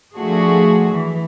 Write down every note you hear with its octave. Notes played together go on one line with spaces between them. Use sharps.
F3 A3 D4 F#4 G#4
E3